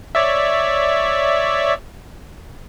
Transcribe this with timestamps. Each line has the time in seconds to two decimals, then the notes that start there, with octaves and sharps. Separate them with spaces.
0.15 C#5 D5 E5